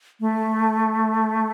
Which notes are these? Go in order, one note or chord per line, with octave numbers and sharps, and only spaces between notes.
A3